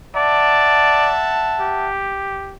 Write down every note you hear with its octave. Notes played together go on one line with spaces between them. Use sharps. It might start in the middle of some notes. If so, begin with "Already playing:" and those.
D5 E5 F#5 A5
G4